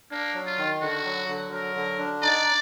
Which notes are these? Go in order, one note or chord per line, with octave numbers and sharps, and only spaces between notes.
A#3 D4
F#3
F4
D#3
D3 F#4
F#3
D3
F#3 A#4
D3
D4
D#4 D5